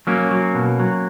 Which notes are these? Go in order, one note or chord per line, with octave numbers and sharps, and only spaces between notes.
F#3 A#3 C#4
F#3
B2
F#3